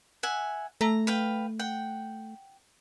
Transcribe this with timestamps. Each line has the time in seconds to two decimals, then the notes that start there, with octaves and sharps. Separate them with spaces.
0.23 E5 F#5 G#5
0.81 A3 A#5
1.07 B4 F5 G5
1.59 F#5 G5